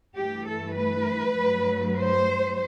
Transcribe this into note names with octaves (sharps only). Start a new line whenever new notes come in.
G2 E3 A3 G4
A4
B4
G2 F#3 A3
C5